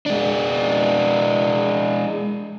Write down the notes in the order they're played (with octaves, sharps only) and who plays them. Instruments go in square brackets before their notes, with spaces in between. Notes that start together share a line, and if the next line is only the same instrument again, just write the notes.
[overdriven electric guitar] G#3 D4